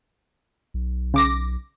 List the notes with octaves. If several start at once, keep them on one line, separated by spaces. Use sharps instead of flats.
B1
C#3 D6 A#6